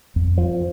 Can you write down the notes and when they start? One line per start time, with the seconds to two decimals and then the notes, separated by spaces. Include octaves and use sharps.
0.16 F2
0.38 F3